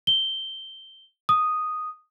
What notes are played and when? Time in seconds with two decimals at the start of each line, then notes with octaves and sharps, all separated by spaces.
0.07 G7
1.29 D#6